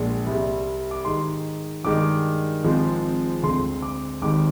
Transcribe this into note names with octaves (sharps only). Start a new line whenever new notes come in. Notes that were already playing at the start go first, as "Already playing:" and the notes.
Already playing: A#1 A#2 G#3
C2 C3 G3 C4
D6
G#2 D#3 G#3 D#4 C6
G2 D#3 G#3 D#4 D6
G#1 G#2 F3 G#3 C4
D2 D3 G#3 C4 C6
D6
G#1 G#2 D#3 G3 D6